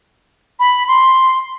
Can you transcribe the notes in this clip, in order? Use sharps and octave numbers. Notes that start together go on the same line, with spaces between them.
B5
C6